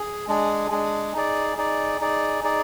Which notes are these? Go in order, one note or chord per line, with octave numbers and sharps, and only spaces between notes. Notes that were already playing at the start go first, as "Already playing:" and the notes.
Already playing: G#4
G#3 D4 G#4
G#3 D4 G#4
D#4 G#4 D5
D#4 G#4 D5
D#4 G#4 D5
D#4 G#4 D5